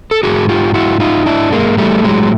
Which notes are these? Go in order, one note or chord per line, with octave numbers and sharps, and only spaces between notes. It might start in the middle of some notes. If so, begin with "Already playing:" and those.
A4
G#2 D#3 F#4 G#4
F4 G4
E4 F#4
D#4 F4
D4 E4
G#3 A#3
A2 E3 G3 A3
F#3 G#3